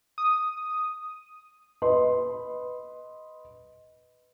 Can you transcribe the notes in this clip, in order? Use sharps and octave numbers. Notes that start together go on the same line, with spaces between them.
D#6
B4 D#5 C6